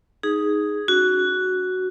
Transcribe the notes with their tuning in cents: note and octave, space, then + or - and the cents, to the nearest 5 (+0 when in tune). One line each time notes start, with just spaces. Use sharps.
D#4 +0 G#4 +0
C#4 +35 F#4 +0